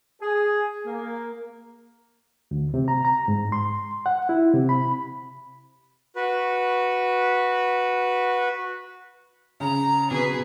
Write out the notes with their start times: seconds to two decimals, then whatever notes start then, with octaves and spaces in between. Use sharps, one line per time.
0.21 G#4
0.86 A#3
2.51 D2
2.74 C3
2.88 A#5
3.05 A#5
3.28 G#2
3.52 C6
4.06 F#5
4.29 E4
4.54 C3
4.69 B5
6.16 F#4 B4
9.60 C#3 A#5
10.11 B2 G#4 B4